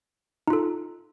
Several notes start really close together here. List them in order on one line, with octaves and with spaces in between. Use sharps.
D#4 F4 A4